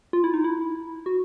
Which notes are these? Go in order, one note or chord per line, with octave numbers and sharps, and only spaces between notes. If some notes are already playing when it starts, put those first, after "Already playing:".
F4
E4
D#4
E4
F#4